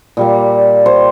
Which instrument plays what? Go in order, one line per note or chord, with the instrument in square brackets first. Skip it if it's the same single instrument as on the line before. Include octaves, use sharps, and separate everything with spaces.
[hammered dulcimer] A#2 G3 A#3
C5